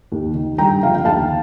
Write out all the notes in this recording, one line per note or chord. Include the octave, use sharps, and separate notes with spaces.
D#2
D#3
G2 G5 A#5
D3 F3 F5
G5
D#2 F5 A5